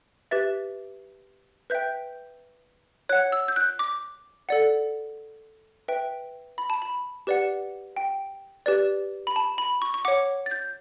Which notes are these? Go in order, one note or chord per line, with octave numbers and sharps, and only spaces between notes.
G4 B4 E5 A6
B4 E5 G5 G6
C#5 F#5 F#6
E6
G6
F#6
D6
A4 D5 F#5
B4 E5 G5
B5
A5
B5
G4 B4 D5 F#5
G5
G4 B4 D5
B5
A5
B5
C#6
C#6
C#5 F#5 D6
A6
G6